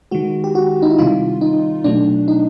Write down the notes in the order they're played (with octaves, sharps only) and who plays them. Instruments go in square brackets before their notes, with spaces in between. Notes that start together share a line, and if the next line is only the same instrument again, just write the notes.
[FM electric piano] D#3 G#3 F#4
G4
F#4
D#4
E4
C3 D#3 G3 F4
D#4
B2 F#3 A3 D4
D#4